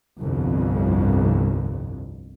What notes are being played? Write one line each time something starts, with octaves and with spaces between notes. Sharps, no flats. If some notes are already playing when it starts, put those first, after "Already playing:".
G1 C2 F2